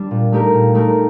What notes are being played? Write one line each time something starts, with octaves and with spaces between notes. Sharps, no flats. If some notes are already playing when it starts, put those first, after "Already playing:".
Already playing: G3 D4
A#2
A3 D#4 G4 A#4
A#2
A3 D#4 G4 A#4